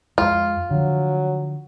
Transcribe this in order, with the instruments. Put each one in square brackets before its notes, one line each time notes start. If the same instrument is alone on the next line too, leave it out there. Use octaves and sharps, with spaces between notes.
[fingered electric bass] F2 G#3 [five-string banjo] F4
[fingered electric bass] D3 F3 [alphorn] F#3